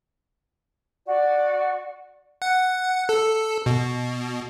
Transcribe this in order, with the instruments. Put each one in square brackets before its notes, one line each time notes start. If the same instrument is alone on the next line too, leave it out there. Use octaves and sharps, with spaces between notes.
[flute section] F#4 D5
[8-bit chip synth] F#5
A4
B2